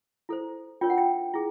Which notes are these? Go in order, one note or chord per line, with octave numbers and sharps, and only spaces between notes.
E4 A4 C5
D4 F4 A#4 C#5 G5
F#5
G5
E4 G#4